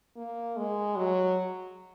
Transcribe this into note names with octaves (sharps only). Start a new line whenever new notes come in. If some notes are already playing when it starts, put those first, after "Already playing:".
A#3
G#3
F#3